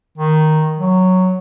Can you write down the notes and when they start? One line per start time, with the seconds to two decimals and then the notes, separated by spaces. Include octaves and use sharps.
0.18 D#3
0.76 F#3